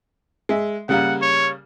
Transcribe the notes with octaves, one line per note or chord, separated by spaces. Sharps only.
G#3 E5
C#3 G3 A#3 F#5
C#5